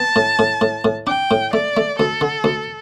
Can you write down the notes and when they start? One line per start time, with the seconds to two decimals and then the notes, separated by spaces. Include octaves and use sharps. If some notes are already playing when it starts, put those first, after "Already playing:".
Already playing: B3 A5
0.16 A2
0.39 A2
0.61 A2
0.85 A2
1.07 D4 G5
1.31 A2
1.53 A3 D5
1.77 A3
1.99 D2 A4
2.21 D3
2.44 D2